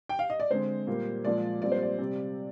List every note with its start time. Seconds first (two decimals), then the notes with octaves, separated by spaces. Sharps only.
0.09 G5
0.19 F5
0.30 D#5
0.40 D5
0.50 D3 G#3 C4 C5
0.87 A#2 G3 A#3
1.25 A#2 F3 G#3 D5
1.62 A#2 G3 C4 D5
1.72 C5
1.82 D5
1.99 C3 G3 C4